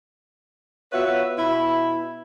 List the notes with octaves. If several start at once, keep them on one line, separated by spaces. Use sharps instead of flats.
B3 F4 F#4 B4 C#5 E5
B2 E4 B5